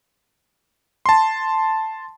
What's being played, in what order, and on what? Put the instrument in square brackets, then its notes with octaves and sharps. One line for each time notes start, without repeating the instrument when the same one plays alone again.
[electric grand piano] A5 C6